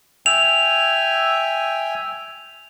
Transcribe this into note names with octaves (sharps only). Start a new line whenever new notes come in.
E5 G5 G#5 F7